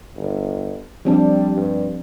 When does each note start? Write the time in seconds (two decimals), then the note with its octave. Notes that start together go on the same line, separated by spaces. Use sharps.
0.16 G1
1.05 F3 G3 C4 D4
1.56 G2